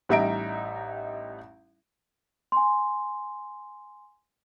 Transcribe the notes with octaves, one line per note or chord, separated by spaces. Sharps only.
A1 G3 D#4 E5 A#5 D7
G#5 C6